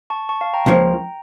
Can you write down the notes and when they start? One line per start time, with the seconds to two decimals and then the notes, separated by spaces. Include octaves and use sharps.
0.10 A5 C#6
0.29 A5 C#6
0.41 F5 A5
0.53 G5 A#5
0.66 C#2 C#3 F3 A#3